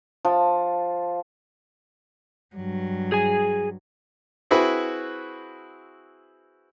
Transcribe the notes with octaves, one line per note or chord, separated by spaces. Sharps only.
F3
G2 F#3
G#4 G#5
C4 E4 F#4 G#4 B4